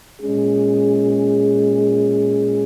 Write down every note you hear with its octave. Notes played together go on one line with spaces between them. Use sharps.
A#2 G#3 C#4 G#4